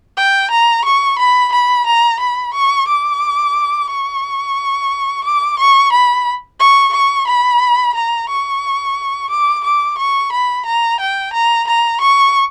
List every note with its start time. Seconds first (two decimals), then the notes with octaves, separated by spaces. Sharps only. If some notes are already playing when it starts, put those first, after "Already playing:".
0.17 G5
0.51 A#5
0.85 C#6
1.19 B5
1.53 B5
1.87 A#5
2.20 B5
2.54 C#6
2.88 D6
3.89 C#6
5.24 D6
5.59 C#6
5.93 B5
6.60 C#6
6.93 C#6
7.28 B5
7.95 A#5
8.29 C#6
9.30 D6
9.65 D6
9.98 C#6
10.32 B5
10.66 A#5
11.00 G5
11.34 A#5
11.68 A#5
12.01 C#6